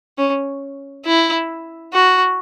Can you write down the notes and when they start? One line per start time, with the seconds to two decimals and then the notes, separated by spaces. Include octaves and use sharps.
0.18 C#4
1.06 E4
1.93 F#4